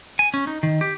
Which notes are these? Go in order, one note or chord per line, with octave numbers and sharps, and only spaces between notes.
G#5
C#4
D#4
D#3
G4